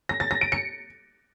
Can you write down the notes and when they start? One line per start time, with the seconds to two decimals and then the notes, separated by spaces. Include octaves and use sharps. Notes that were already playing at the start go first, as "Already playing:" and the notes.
0.09 A#6
0.20 A6
0.31 A#6
0.41 D7
0.52 C#7